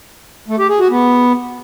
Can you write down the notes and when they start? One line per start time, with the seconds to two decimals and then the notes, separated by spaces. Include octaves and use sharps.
0.48 A3
0.59 G4
0.69 G#4
0.80 F#4
0.90 B3